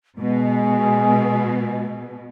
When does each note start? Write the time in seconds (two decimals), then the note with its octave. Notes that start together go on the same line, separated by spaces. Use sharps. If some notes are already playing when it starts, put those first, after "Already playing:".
0.19 B2 G#3